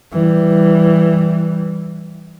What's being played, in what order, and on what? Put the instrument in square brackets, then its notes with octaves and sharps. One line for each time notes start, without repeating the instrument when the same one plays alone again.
[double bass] E3 G3